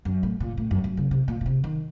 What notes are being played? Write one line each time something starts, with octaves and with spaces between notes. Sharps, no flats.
F#2
A2
A#2
A2
F#2
F#2
C#3
C3
A#2
A#2
C3
D#3